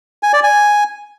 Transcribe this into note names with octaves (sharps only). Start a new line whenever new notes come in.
G#5
D5
G#5